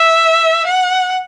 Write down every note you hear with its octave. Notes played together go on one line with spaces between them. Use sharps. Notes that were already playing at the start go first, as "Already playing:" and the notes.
Already playing: E5
F#5